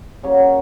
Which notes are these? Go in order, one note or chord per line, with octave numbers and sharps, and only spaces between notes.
C#3 F#3 A#3 C#4 C#5
C#4 C#5